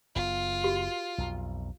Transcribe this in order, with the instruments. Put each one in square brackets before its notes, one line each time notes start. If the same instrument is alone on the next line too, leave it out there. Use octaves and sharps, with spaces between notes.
[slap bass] F#1 B3 [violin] F4
[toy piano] F#4 G4 A#4
[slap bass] B1 F2